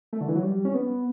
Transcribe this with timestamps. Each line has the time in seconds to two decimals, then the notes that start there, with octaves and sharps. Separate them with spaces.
0.13 A3
0.21 D3
0.28 E3
0.35 F#3
0.43 G3
0.65 C#4
0.74 B3